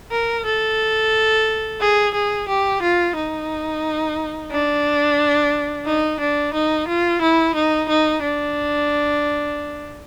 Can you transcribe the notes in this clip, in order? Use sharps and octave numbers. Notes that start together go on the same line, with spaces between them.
A#4
A4
G#4
G#4
G4
F4
D#4
D4
D#4
D4
D#4
F4
E4
D#4
D#4
D4